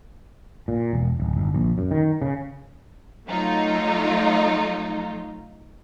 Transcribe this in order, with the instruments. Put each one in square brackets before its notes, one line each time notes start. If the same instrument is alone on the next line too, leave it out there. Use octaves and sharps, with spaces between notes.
[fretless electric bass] A#2
E1
D1
G1
A#1
F#2
D#3
C#3
[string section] F#3 A3 D#4 F4